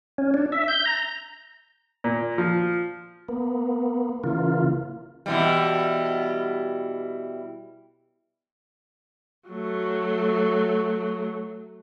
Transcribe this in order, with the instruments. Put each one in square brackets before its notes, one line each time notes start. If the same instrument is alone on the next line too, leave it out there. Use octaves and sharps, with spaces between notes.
[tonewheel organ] C#4
D4
E5
G6
A#5
[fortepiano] A#2
F3
[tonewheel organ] A#3 B3
C#3 E3 A#3 F4
[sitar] B2 E3 G3
[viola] F#3 A3